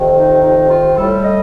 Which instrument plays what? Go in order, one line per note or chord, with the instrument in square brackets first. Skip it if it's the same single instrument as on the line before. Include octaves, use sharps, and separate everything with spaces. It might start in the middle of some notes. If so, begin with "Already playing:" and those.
Already playing: [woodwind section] F2 C3 D#3
D#4
D#4
F4
A2 G3 A4
D#5